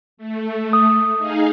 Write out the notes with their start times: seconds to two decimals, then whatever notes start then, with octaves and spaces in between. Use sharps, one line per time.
0.17 A3
0.73 D#6
1.18 D#4 G#4 F5